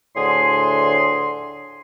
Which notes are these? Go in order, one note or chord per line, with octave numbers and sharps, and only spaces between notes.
D2 A2 D3 G#4 C6